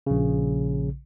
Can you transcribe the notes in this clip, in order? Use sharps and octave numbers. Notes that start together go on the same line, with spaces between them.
A#1 C#3